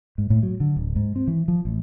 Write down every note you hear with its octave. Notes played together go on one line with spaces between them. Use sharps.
G#2
A2
F#3
D3
D1
G#2
C4
E3
F3
A1